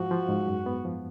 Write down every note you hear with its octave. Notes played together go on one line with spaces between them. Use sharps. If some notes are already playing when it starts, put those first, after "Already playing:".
Already playing: G#2 F3 F#4
F3
G#2
F#2
B3
F3